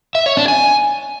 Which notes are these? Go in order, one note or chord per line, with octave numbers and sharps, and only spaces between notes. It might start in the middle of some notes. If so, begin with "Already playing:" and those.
E5
C#5
D4
G#5